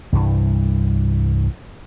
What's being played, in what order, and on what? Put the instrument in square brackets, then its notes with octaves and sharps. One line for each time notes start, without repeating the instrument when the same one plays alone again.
[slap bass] C2 G2 E3